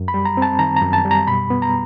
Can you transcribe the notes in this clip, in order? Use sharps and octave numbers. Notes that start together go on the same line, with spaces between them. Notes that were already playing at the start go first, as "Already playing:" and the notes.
Already playing: F#2
B5
G3
A#5
C4 A5
D#3 A#5
A#5
F#2
A5
G3
A#5
B2 B5
B3
A#5